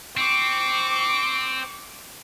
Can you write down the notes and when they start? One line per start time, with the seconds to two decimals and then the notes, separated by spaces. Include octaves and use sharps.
0.17 C4 C#6 D6